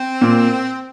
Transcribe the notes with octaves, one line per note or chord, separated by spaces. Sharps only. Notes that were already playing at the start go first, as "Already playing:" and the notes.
Already playing: C4
A#2